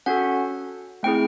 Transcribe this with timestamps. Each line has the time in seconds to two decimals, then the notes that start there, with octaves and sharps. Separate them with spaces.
0.06 C#4 F#4 A4 F#5
1.03 A3 C4 E4 G#4 G5